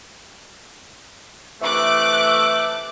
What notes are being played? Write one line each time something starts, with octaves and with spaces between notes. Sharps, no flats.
C3 E3 A3 D6 F#6